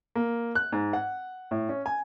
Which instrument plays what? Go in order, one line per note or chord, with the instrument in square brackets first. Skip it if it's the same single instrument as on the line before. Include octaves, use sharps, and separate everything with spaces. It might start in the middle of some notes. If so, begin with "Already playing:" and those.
[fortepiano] A#3
F#6
G#2
F#5
A2
C#4
G#5